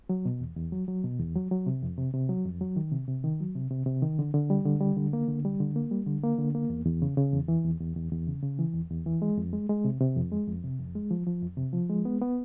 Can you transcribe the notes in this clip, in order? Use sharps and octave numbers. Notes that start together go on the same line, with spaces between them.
F#3
B2
E2
E2
F#3
F#3
B2
E2
F#3
F#3
C3
F2
C3
C3
F#3
F2
F#3
D#3
C3
C3
D#3
F#3
C3
C3
C3
D#3
D3
D3
G3
D3
G3
D3
A#3
D3
G3
D3
A#3
G3
D3
A#3
D3
A#3
E2
E2
C#3
C#3
E2
E3
E2
E2
E2
E2
C#3
C#3
E3
E2
E2
E3
G#3
F2
G#3
G#3
C3
C3
F2
G#3
F2
C3
F2
G#3
F3
F3
F2
C3
F3
G#3
B3
B3